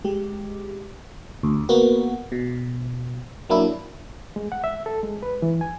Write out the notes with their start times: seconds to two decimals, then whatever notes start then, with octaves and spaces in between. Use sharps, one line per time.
0.05 G#3 G4
1.43 D2
1.69 A#3 B3 F#4
2.32 B2
3.50 F#3 A#3 D4 E4
4.36 G#3
4.52 F#5
4.64 E5
4.86 A4
5.03 G#3
5.23 B4
5.42 E3
5.61 G#5